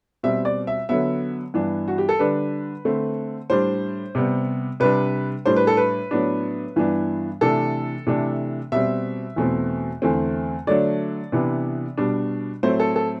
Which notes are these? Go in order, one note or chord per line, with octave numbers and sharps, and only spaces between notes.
B2 G3 C4 E5
D5
E5
D3 F#3 B3 E5
G2 E3 B3 D4
F#4
G4
A4
D3 G3 D4 B4
D3 A3 C4
A2 G3 D4 C5
C3 G3 B3
C3 G3 D4 B4
A2 G3 D4 C5
B4
A4
B4
A2 F#3 B3 D4
G2 E3 B3 D4
C3 E3 A3 D4 A4
C3 E3 A3 D4
B2 G3 C4 E5
E2 B2 A3 C4
E2 D3 A3 C4
D3 F#3 A3 D4 D5
C3 E3 B3 D4
B2 G3 D4
A2 F#3 A3 C4 C5
A4
A4